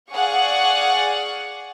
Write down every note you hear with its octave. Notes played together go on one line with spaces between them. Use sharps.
G#4 D5 F5 F#5 C#6